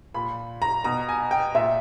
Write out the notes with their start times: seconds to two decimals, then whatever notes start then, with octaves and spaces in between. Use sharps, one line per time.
0.14 A#2 B5
0.62 A#5
0.84 B2 A#5
1.09 G#5
1.31 G5
1.55 A#2 E5